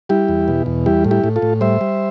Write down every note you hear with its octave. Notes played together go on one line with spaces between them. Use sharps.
G3 E4 G4
E2
B2
E2
G3 E4 G4
A2
E4 G4
A2
F4 A4
A2
G3 C5 E5
G3